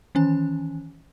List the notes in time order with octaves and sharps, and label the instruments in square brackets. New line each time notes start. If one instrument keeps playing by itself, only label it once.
[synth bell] D#3 E3 C#4 G#5